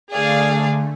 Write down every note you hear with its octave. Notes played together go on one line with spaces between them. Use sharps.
D3 A3 G#4 D5 F5